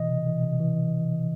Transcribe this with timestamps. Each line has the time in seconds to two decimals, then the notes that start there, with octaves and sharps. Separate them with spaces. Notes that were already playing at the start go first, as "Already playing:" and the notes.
Already playing: B2 E3 D#5
0.09 C3
0.26 E3
0.42 C3
0.60 E3